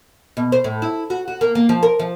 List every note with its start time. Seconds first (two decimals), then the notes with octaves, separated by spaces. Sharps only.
0.37 B2
0.52 C5
0.64 A2
0.82 E4
1.10 F#4
1.28 F#4
1.41 A#3
1.55 A#3
1.69 F3
1.83 A#4
1.99 F3